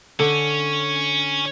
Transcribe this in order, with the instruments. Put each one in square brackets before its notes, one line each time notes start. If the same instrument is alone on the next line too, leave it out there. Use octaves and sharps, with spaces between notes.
[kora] D3 [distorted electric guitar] C#4